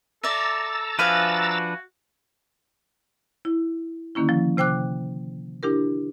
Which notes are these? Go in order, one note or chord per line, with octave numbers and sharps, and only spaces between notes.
A4 D5 E5 A#5 E6 A6
F3 D4 F#4 B4 E5 F5 G#5
E4
D3 D#3 A#3 C#4 E4
F3
C3 C5 G5 D6 F#6
D4 E4 G4 A#4